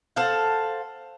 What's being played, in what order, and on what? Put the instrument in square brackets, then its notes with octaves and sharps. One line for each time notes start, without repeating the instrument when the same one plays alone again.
[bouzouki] A4 C5 F5 F#5